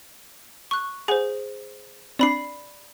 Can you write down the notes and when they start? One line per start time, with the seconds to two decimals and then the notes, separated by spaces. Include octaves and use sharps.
0.71 C#6 F#6
1.08 G#4 C5 F#5 G#5
2.19 C4 D4 D5 B5 C7